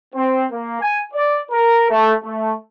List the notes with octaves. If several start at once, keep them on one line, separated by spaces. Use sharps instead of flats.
C4
A#3
G#5
D5
A#4
A3
A3